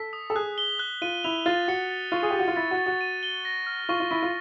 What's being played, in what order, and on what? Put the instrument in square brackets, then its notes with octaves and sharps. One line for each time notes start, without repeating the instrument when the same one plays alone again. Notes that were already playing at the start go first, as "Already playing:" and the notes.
Already playing: [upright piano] A4 [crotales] B6
[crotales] D#6
[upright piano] A4
[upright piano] G#4 [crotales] F#6
[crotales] G7
F#6
[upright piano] F4 [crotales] D#7
[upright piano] E4 [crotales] F7
[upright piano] F4 [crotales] A6
[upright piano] F#4 [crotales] C#7
[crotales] A6
[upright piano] F4 [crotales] C#6
[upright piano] G#4
G4
[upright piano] F#4 [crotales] A6
[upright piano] F4
[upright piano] E4 [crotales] A6
[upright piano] F#4
[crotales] A6
[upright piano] F#4
[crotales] D#7
G7
A#6
F6
[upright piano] F4 [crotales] C#6
[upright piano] F4
[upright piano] E4 [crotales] C#6
[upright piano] F4